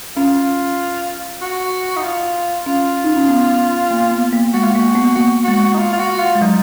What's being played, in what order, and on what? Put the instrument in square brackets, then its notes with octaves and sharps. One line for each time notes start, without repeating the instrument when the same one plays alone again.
[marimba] C#4 [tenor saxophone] F4
[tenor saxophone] F#4
D#4
F4
[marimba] C#4 [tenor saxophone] F4
[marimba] D#4
C#4
B3
A#3
B3
A#3
[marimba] G#3 [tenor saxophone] F#4
[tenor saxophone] F4
[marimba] A#3 [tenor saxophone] F#4
[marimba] B3
[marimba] A#3 [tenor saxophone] F#4
[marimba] G#3 [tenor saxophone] F#4
[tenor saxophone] D#4
F4
F4
F#4
F4
[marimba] G#3
[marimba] F#3 [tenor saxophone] D#4